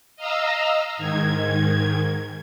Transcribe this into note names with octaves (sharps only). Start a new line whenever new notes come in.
D#5 F5 A#5 E6
G#2 D#3 G#6